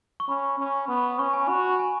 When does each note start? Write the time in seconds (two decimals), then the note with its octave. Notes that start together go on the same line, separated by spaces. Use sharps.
0.20 C#6
0.29 C#4 B5
0.59 C#4
0.88 B3 B5
1.04 C#6
1.19 C#4 C#6
1.34 G#5
1.49 F#4 B5
1.79 G#5